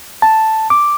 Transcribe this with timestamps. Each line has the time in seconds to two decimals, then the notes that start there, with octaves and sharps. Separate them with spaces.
0.22 A5
0.70 D6